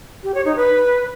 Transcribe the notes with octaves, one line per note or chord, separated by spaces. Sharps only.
G4
C#5
D#4
B4